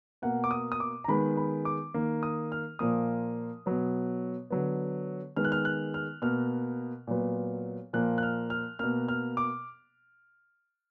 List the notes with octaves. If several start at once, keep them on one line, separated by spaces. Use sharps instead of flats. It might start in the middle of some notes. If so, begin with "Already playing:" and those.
B2 A#3 F#5
D6
D#6
D#6
D6
A#5
D#3 G#3 B3 B5
B5
D6
D#3 A#3
D#6
F6
A#2 F3 A#3 D#6
B2 F#3 B3
D3 F#3 B3
D#3 G#3 B3 F6
F#6
F6
F#6
F6
B2 A#3 F6
A#2 F#3 B3
A#2 F3 A#3 F#6
F#6
F6
F6
B2 A#3 F6
F6
D6